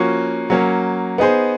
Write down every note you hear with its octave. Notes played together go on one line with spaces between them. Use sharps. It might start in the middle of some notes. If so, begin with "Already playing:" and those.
Already playing: F3 A#3 C#4 F#4
F#3 A#3 C#4
B3 D#4 G#4 C5